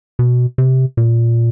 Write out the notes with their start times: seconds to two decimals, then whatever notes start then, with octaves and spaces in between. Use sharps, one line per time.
0.19 B2
0.58 C3
0.97 A#2